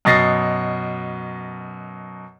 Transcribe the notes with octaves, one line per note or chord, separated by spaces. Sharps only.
F#2 B2 D#5 A6 A#6 C7